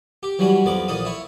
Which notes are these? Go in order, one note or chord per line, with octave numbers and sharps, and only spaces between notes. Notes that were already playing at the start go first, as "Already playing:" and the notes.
G4
E3 F#3 G3 C#4 F#4
F2 B3 D5 D6
A#1 E3 A4 D#6
E4 C#5